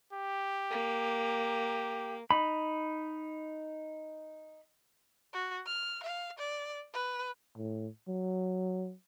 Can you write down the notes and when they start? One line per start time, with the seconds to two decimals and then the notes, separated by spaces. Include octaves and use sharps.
0.13 G4
0.71 A#3
2.31 D#4 B5
5.33 F#4
5.66 F6
6.03 F5
6.39 D5
6.93 B4
7.56 A2
8.08 F#3